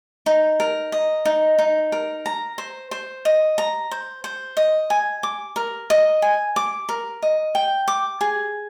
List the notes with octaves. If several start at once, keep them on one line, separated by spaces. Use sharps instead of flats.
D#4
A#4
D#5
D#4
D#4
A#4
A#5
C5
C5
D#5
A#5
C5
C5
D#5
G#5
D6
A#4
D#5
G#5
D6
A#4
D#5
G5
D6
G#4